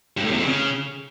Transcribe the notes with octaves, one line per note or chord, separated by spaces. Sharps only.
G2
A2
E2
F2
C#3